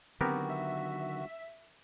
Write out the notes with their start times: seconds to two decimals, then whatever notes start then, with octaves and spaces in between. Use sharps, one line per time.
0.21 D3 D#3 F#3 B3 C4 F#4 G4 A#4
0.50 E5